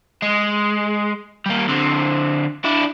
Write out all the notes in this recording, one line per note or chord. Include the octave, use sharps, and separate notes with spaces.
G#3
G3 A#3
D3 C4
D4 E4